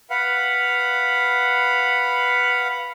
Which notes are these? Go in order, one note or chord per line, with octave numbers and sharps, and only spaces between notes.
B4 F5 F#5